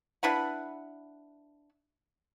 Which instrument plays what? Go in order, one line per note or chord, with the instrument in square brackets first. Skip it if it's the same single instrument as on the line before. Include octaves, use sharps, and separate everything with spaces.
[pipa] D4 E4 B4 F#5